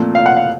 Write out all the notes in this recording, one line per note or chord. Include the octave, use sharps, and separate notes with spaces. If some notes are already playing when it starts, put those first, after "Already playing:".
Already playing: A#2 F3 A3 C4
F5
F#5
F5